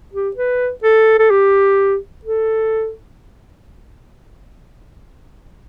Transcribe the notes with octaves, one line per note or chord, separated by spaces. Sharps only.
G4
B4
A4
A4
G4
A4